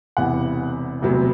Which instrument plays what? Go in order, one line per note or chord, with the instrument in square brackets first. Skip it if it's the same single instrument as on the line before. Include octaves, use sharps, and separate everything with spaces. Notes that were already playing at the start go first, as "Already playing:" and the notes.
[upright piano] E1 E2 C3 E3 F#5
E1 D2 C3 F#3 B3